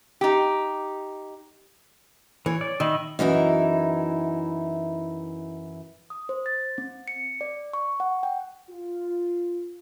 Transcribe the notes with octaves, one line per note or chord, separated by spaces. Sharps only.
D#4 G4
E3 C#5
D5
D#3 D#5 E5 B5
F#2 E3 D#4 E4
D#6
C5
A6
C4
C#7
D5
C#6
F#5
G5
F4